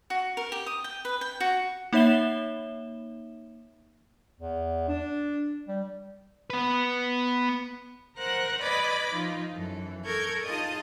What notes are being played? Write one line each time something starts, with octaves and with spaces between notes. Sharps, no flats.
F#4
A#4
G4
D#6
G5
B4
G5
F#4
A#3 D#4 C#5 E5 E7 G7
E2
D4
G3
B3 B4
A#4 C5 F#5 A#5
B4 D5 D#5 B5 D6 G#6
F3 D#4 F4
F#2 E3 A4
A4 A#4 C#6 G6 G#6
D#4 F4 G#4 D#5 A5 D#6